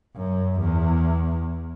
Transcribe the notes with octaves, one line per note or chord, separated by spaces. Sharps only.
F#2
E2